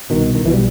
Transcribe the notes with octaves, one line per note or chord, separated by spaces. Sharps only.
C2 B2 D#3
D#3
B1 B2 E3
G3